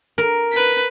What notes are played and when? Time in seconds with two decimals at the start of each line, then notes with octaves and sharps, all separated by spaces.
0.18 A#4
0.52 B4 B6